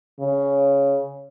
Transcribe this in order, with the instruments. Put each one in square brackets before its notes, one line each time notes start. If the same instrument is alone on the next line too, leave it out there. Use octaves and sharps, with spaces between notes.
[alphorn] C#3